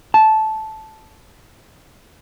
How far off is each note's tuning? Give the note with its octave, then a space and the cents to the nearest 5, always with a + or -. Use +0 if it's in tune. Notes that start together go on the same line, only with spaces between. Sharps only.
A5 -10